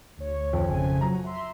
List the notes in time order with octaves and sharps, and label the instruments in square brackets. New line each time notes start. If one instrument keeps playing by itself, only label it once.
[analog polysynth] D2 C#5
[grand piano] F2
[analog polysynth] G#1 C#3 G#5
[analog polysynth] F#3 F#4 [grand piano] A#5
[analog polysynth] E5 C6